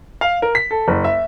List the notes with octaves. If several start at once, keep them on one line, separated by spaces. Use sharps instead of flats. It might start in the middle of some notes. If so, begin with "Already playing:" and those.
F5
A#4
B6
A4
F#1
E5